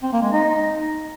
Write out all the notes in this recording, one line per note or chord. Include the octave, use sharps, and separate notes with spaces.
C4
A#3
G#3
D#4